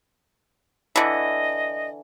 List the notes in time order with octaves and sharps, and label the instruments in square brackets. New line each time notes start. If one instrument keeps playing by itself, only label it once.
[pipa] D3 E3 [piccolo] D#5